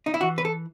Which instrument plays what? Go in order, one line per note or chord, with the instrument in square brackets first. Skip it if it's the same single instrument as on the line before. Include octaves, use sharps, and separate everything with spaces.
[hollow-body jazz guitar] D#4
E4
E3 F#4
B4
A4